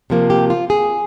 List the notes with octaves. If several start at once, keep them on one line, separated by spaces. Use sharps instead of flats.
C3 F3 A#3
G4
F4
G#4